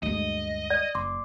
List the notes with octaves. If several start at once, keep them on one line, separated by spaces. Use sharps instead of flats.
D2 G2 G#3 D#5
D5
F#1 C6 D6